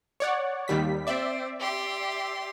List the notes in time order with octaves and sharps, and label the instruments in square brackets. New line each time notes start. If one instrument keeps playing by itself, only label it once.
[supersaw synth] C#5 D5 F#5
D#2 G3 B6
[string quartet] C4 [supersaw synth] D5 E5
[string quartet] G4 C6